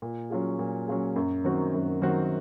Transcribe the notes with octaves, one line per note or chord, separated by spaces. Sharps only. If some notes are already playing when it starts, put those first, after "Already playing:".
A#2
F#3 C#4 F4 G#4
A#2
F#3 C#4 F4 G#4
F#2
D#3 F#3 C4 F#4
F#2
D#3 F#3 C4 F#4